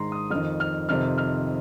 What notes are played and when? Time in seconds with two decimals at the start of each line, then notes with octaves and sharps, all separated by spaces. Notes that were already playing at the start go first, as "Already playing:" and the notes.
Already playing: G#2 D#3 A#5 C6
0.12 D#6
0.31 F2 D#3 F6
0.60 F6
0.89 F2 C3 D#3 F6
1.18 F6